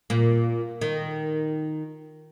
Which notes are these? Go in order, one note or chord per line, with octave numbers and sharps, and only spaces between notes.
A#2
D#3